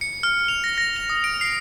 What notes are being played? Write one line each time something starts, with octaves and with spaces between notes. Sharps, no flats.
C#7
F6
F7
A#6
A#6
F7
D#6
D7
C7